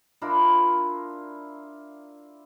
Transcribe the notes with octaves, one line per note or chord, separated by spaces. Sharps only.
D4 E4 F4 A#4